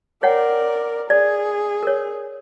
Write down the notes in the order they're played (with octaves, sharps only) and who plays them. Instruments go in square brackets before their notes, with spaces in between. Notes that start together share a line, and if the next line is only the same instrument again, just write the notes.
[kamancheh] A#4 D5 [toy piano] C#5 F#5 G5
[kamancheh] G#4 [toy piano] D5
[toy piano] A#4 C#5